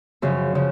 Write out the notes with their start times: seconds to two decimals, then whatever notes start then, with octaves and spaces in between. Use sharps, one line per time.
0.22 F#2 C#3 F3
0.55 C#3 F3